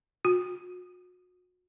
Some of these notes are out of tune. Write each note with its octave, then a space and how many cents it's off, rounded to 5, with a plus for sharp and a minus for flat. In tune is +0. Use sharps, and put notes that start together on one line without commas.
F#4 -35